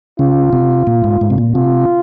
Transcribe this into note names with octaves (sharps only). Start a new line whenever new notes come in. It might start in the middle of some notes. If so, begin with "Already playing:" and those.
C#3 F4
C3
A#2
G#2
G#2
C3
A#2
C3 F4